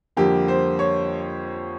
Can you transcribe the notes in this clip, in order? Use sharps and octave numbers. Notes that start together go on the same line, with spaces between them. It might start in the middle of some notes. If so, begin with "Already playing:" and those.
F2 D3 G3 A#3 G4
C5
C#5